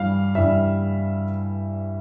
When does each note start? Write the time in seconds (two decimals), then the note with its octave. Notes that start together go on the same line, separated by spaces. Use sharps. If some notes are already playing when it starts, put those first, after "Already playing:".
Already playing: G2 E3 G3 F5
0.35 G2 E3 G3 E5